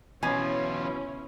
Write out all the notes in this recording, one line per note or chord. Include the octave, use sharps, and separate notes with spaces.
B2 E3 C#4 E4 F4 G#5